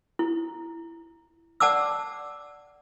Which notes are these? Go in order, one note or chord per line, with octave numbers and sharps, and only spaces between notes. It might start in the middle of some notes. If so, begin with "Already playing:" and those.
E4
D5 F#5 A5 D6 E6